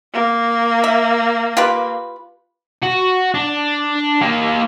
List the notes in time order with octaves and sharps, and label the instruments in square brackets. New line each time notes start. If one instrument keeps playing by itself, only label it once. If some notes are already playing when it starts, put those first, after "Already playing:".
[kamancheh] A#3
[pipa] E5
F4 G4 B4
[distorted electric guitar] F#4
D4
A#3 G4